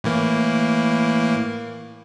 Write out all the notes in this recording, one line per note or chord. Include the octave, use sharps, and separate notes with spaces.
A2 E3 A#3